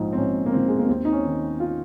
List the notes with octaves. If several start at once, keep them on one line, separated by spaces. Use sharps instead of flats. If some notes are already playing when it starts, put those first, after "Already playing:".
Already playing: A#1 G#2 F3 D#4
C4
A#1 C#4
A#3
G#2 F3 C4
G#3
A#3
D#2 C4
D#4
C#4
D#3
F4